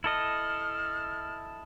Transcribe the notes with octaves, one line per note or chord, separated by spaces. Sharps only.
E4 A4 D#5 F6